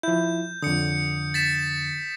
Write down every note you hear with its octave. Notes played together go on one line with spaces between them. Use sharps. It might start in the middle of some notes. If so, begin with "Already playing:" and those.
F3 E4 G6
F2 D3 D#6 C#7
A6 B6 E7